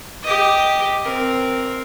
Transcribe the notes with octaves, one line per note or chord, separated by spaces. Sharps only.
G4 D#5
C4 A#4